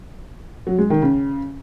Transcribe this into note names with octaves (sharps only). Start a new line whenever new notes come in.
F#3
G#3
D#3
C#3